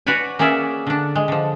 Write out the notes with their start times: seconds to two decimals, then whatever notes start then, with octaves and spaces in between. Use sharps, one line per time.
0.07 F#4 B4 C#5 D5 G#5
0.39 A#3 C#4 G#4 D5 E5
0.87 D3 D4
1.15 G#3
1.28 D3 F3